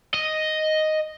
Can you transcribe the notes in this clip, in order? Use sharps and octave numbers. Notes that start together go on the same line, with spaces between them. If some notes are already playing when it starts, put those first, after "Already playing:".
D#5